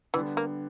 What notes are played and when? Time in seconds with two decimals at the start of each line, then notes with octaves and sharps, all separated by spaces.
0.14 D3 E3 G3 B3
0.37 A#3